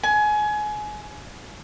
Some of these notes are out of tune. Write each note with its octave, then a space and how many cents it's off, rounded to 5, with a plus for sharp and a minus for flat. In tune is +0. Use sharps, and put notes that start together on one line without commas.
G#5 +25